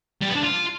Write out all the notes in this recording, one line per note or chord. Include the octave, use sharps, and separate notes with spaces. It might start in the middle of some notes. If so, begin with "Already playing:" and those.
G3
B3
D4
F4